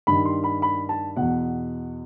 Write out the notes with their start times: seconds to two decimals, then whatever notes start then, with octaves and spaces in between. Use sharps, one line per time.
0.07 G2 D#3 B5
0.25 C6
0.44 B5
0.62 B5
0.89 A5
1.16 E2 B2 F#5